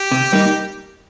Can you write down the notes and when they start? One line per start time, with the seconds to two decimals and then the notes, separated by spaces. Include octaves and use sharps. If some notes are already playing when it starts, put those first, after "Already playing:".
Already playing: G4
0.12 C3
0.33 G3 A#3 D#4